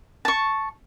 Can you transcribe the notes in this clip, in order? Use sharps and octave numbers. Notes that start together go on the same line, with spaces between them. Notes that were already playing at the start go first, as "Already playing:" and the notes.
A5 C#6